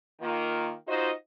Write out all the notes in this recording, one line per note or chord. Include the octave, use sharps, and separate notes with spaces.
D#3 A#3 F4
D#4 F4 F#4 C5 D#5